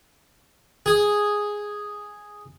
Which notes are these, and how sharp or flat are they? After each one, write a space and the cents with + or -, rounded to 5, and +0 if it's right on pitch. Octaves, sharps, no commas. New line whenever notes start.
G#4 +0